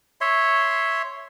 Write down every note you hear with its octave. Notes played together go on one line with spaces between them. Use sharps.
C#5 E5 C6